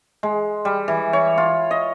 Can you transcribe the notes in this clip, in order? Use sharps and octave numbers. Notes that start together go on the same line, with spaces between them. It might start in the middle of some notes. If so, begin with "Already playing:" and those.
G#3
G3
E3
C#5
F4
D#5